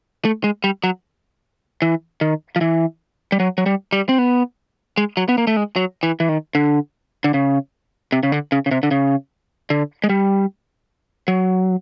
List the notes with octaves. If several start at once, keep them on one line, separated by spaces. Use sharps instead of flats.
A3
G#3
G3
F#3
E3
D#3
F3
E3
G3
F#3
F#3
G3
G3
C4
B3
G#3
F#3
B3
A#3
A3
G#3
F#3
E3
E3
D#3
D3
D3
C#3
C3
C#3
D3
C#3
C#3
C3
D3
C#3
D3
G#3
G3
F#3